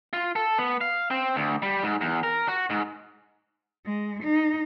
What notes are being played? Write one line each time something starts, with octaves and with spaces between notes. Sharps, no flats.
F4
A4
B3
F5
C4
D2
G3
G#2
E2
A#4
F#4
G#2
G#3
D#4